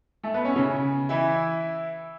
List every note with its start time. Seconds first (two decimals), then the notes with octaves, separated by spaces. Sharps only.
0.23 A3 A4
0.34 B3 B4
0.45 C#4 C#5
0.56 C#3 C#4
1.09 E3 E4